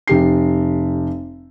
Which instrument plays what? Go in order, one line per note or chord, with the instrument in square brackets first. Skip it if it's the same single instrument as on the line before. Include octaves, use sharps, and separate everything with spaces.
[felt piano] F1 G4 C7